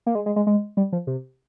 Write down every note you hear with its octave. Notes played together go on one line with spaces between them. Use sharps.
A#3
G#3
G#3
G#3
G#3
G3
F3
C3